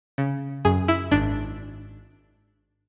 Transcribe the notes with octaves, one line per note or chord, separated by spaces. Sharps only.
C#3
F#2 G#4
E4
G#1 D4